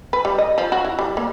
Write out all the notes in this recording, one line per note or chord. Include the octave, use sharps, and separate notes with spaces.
B4
G3
D#5
F3
F#4
E4
G3
A#3